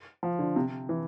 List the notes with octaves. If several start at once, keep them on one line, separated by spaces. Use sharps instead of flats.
F3
D3
C3
E3